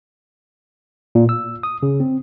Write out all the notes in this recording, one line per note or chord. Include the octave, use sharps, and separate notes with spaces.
A#2
E6
D#6
C#3
C4